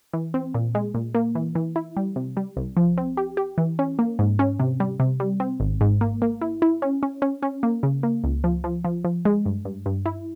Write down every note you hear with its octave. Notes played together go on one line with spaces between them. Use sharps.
E3
C4
A#2
G#3
A#2
A#3
E3
E3
E4
G3
C3
G3
C2
F3
C4
G4
G4
E3
C#4
A#3
G#2
C#4
C3
G3
C3
G3
C4
G#1
G#2
A#3
A#3
E4
E4
C#4
C#4
C#4
C#4
A#3
C#3
A#3
C#2
F3
F3
F3
F3
G#3
G2
G2
G2
E4